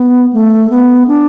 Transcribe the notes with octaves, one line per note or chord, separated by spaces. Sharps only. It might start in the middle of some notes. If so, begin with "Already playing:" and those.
Already playing: B3
A3
B3
D4